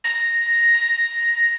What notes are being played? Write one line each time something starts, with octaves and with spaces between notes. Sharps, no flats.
A#6